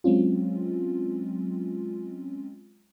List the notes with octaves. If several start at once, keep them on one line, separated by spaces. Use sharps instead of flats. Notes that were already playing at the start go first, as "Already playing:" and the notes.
F#3 G#3 C4 C#4 F4